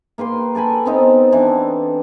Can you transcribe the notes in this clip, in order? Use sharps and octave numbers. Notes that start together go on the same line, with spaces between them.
A#3 B4 G5 C6
A4 G5 G#5 B5
B3 C4 D#4 G5
E3 D4